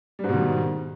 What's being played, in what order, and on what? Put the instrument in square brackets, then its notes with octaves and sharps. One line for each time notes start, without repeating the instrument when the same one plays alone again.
[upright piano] G3
G#2
B2
D#3